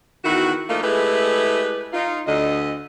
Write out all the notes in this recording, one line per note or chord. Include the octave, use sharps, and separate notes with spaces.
E2 D#3 E4 F#4
F3 A3 A#3 D#4 F4
G#3 A3 E4 G4 G#4 B4
D#4 F4
D2 D3 D#5